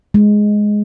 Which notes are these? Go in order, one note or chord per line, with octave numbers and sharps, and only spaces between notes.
G#3